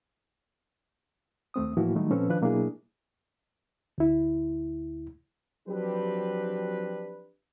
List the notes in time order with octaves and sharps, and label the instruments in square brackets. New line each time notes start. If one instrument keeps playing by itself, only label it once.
[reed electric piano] D#2 A3 C4 D#6
A2 E3 F3 A#3 E4 F#4
D#3 F#3 G3 A3 D#4
A#2 F3 C4 C#4 A4 B4
D#3 F3 D4 B4 F#6
B2 F#3 A#3 D4 E4 G#4
D2 E4
[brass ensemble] F3 F#3 C4 D4 G4 B4